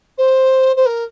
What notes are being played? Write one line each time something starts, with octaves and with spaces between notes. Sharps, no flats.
C5
C5
A#4